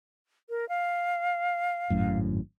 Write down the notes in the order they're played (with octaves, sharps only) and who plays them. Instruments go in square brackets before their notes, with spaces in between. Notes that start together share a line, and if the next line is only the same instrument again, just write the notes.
[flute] A#4
F5
[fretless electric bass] G#1 F#2 A2